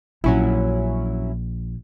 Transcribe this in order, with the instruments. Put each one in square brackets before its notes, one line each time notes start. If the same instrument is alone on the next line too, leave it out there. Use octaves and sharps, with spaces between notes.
[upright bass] A#1 [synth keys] F#3 C#4 E4